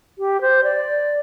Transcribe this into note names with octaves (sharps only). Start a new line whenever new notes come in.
G4
C5
D5